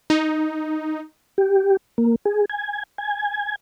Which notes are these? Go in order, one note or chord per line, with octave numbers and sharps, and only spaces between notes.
D#4
G4
A#3
G#4
G#5
G#5